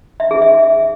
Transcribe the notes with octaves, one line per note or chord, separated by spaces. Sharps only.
E5
G#4
E5